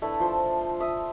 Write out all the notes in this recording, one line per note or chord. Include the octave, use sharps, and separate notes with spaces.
A3 D4 E4 B4
F3 C5
E5 D#6